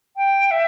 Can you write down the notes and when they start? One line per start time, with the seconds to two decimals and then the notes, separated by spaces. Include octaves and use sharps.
0.17 G5
0.51 E5